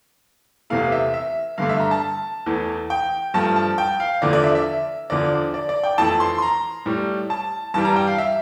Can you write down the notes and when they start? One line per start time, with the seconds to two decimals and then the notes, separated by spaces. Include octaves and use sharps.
0.70 E2 C3 E3 A3 F5
0.92 E5
1.14 E5
1.58 G2 D3 A3 F5
1.69 E5
1.80 A#5
1.91 A5
2.46 E2 E3 A3
2.90 G5
3.34 G2 F3 A3 A5
3.56 A5
3.78 G5
4.00 F5
4.22 E2 D3 F3 A3 D5
4.33 D5
4.44 E5
4.55 E5
5.10 E2 D3 F3 D5
5.54 D5
5.69 D5
5.84 G5
5.98 F2 E3 A3 A5
6.20 C6
6.38 C6
6.42 A#5
6.86 A2 G3
7.30 A5
7.74 G2 E3 G3 A5
7.85 A#5
7.96 G5
8.07 F5
8.18 E5